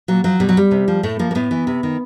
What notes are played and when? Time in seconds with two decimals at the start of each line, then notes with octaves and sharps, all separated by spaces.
0.08 A#2 F#3
0.24 F3 F#3
0.40 B2 G3
0.49 F#3
0.57 G3
0.71 C3
0.88 F3
1.03 A2 A3
1.19 F3 A#3
1.31 A#3
1.35 A2 B3
1.51 E3
1.67 C3
1.83 D#3